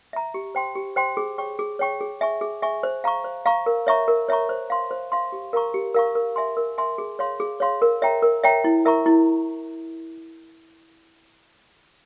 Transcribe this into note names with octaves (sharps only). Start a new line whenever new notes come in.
E5 A#5
G4
C5 G5 C6
G4
C5 G5 C6
G#4
C#5 G5 C#6
G#4
C#5 G5 C#6
G#4
E5 G#5 C#6
G#4
E5 G#5 C#6
C5
F5 A#5 C#6
C5
F5 A#5 C#6
A#4
C#5 E5 A#5 C#6
A#4
C#5 E5 A#5 C#6
C5
F5 C6
C5
F5 C6
G4
A#4 F5 A#5 C#6
G4
A#4 F5 A#5 C#6
A#4
E5 G#5 C6
A#4
E5 G#5 C6
G#4
C#5 F5 C6
G#4
C#5 F5 C6
A#4
C#5 E5 G5 A#5
A#4
C#5 E5 G5 A#5
E4
A#4 E5 A#5 C#6
E4